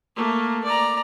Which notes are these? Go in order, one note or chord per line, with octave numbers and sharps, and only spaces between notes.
A3 A#3
D5 A#5